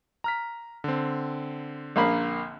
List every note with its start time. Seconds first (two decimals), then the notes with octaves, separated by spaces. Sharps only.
0.24 A#5 F6 B6
0.84 D3 C4
1.96 A#1 A#3 B5